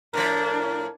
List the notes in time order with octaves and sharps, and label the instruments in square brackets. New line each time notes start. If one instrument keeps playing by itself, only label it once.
[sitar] A2 F3 [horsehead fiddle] D4 [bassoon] A#4